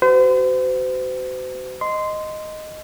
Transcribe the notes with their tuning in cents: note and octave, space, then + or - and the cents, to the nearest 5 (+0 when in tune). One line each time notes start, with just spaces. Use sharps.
F#4 +30 C5 -40
D#5 -5 C6 -15